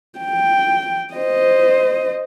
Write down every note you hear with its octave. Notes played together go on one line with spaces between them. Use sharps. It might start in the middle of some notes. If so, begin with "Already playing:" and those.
G5
C5 D#5